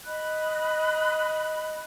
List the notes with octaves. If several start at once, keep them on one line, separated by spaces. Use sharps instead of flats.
D#5 B5 F#6